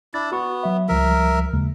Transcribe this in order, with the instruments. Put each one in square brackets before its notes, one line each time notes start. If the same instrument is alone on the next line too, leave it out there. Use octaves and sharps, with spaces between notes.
[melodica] D4 E4 [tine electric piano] A6
[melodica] B3 [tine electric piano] F#4 C#6
[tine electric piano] F#3 E5
[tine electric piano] C#2 F3 G3 [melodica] A#4 E5
[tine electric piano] D#2 C#3 G#3